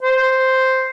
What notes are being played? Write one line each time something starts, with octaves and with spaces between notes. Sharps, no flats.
C5